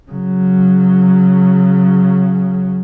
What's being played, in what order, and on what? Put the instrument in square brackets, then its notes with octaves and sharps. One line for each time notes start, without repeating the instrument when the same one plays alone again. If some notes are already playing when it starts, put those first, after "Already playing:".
[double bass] C#3 F#3